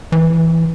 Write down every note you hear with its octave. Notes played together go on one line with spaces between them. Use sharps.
E3